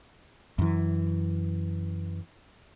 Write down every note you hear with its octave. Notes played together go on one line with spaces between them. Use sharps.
F#2 E3